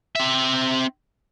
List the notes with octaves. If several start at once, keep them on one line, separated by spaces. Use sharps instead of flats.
C4 E5